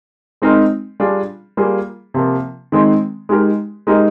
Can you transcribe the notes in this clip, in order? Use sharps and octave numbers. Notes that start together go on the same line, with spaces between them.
G#3 C4 D#4 A#4
G3 D4 F4 G#4
G3 A#3 F4 G#4
C3 F3 A#3
D#3 G#3 C4
G#3 D#4 G4 A#4
G#3 D#4 G4 A#4